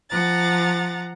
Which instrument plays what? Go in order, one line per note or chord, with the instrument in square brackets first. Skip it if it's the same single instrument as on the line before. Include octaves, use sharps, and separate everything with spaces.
[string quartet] F3 F#5 A#5 A6